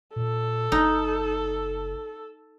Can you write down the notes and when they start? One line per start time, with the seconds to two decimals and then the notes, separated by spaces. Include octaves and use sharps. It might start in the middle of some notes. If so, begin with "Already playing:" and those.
0.16 A#2 A4
0.72 F#1 D#4